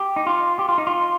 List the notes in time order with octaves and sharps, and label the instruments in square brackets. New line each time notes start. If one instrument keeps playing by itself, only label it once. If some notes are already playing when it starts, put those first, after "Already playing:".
Already playing: [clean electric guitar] G4
D#4
F4
G4
F4
D#4
F4